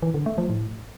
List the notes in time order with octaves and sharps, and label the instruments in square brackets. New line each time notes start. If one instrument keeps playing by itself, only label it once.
[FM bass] E3
D3
A3
F3
A2